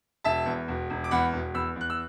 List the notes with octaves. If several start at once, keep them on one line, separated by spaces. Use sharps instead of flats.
E1 E5 A5
E2
E1
E1
D6
E2 F#5 B5
E1
E2 B5 E6
E2
F#6
E6